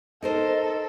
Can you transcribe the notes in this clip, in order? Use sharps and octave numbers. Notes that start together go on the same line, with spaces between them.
D#4 A4 A#4 C5 D#5